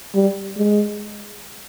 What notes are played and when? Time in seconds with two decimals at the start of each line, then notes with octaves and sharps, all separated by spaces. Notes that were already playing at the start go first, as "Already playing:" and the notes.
0.15 G3
0.57 G#3